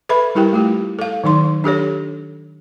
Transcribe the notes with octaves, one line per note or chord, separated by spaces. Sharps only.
A4 B4 E5 B5
G3 E4 G4 A#4 G5
A3 F4 G4
A4 F5
D#3 F#3 D#4 C6
D4 G4 A4 C#5